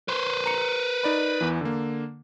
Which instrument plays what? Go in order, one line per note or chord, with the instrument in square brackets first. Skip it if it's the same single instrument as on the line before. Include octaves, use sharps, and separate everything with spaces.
[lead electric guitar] B4 C5
[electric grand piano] A#5 C#7
D#4 D5 B5
E2 E3
D3 A#3